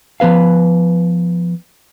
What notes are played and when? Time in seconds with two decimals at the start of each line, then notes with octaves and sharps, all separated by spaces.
0.20 F3 B3 B4 F5